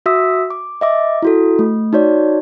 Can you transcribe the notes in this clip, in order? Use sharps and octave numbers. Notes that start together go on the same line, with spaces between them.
F#4 E5 D#6 E6 B6
D6
D#5 E5 D6
E4 F#4 A4
A3
D#4 F#4 C#5 D5